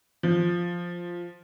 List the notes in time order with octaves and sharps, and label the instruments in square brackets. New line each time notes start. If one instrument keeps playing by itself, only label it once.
[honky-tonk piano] F3